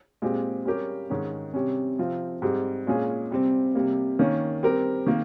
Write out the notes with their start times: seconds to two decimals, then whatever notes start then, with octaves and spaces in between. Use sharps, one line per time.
0.22 A#2 G#3 C4 G4
0.65 G3 C#4 G4 A#4
1.10 G#2 D#3 G#3 C#4
1.54 C3 G3 C#4
1.98 C3 F3 C4 F4
2.42 G#2 G3 C4 G4
2.87 A#2 G#3 C#4 F4 G#4
3.31 C3 G3 C4
3.75 C3 G3 A#3
4.19 D#3 A#3 C#4
4.63 G3 C4 G4 A#4
5.07 D#3 A#3